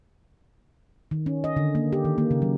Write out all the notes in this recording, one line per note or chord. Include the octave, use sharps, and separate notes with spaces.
D#3
C#4
D#5
D3
A#3
G4
D#3
A#3
C#3
F#3